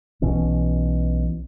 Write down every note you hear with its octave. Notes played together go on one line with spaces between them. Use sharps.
B1 B2 E3 C#4